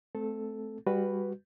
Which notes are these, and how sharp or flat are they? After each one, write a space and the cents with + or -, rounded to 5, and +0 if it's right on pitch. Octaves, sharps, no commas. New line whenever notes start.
A3 -30 C4 -20 A4 -5
G3 +20 F#4 +0 B4 +0